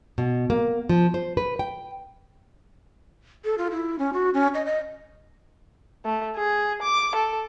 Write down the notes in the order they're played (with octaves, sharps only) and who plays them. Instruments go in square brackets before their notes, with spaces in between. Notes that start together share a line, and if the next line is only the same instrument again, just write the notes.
[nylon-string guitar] B2
A#3
F3
C5
B4
G5
[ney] A4
F4
E4
C#4
F#4
C#4
D#5
D#5
[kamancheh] A3
G#4
D6
A4